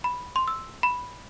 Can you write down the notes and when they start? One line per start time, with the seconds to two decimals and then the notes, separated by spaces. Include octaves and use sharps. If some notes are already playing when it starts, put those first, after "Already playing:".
0.04 B5
0.36 C6
0.48 E6
0.83 B5